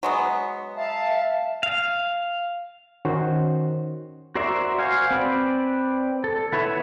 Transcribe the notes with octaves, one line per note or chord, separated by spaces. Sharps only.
F#3 G#3 B3
E5 F5 A5
F5
D#3 C#4 F#4 C5
F#4 A#4 C5 D5 E5
F#4 C5 F5 G#5
C4 B4 D5
A4
B3 E4 B4 C#5 E5